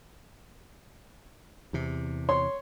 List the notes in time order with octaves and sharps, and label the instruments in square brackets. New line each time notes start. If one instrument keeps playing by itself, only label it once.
[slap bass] E2 C3
[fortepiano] C#5 C6